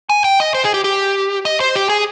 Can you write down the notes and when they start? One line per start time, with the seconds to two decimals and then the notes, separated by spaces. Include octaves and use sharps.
0.10 G#5
0.24 G5
0.40 D#5
0.54 C5
0.65 G#4
0.74 G4
0.84 G4
1.45 D#5
1.60 C5
1.76 G4
1.89 G#4